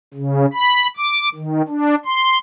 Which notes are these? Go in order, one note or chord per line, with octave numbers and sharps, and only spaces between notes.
C#3
B5
D6
D#3
D4
C6